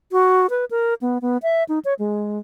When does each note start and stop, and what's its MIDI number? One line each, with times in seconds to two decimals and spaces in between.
0.12 0.47 66
0.50 0.65 71
0.71 0.94 70
1.01 1.18 59
1.22 1.38 59
1.43 1.64 76
1.69 1.79 63
1.85 1.94 73
1.99 2.39 56